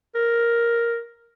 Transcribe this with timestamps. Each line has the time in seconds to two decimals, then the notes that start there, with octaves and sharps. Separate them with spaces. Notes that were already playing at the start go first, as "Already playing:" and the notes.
0.15 A#4